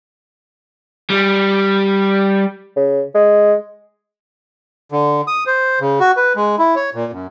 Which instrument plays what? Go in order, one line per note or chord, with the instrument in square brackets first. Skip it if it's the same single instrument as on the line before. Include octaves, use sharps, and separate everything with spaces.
[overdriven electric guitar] G3
[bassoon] C#3
G#3
[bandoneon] D3
D#6
C5
C#3
F#4
B4
G#3
E4
C#5
A#2
F#2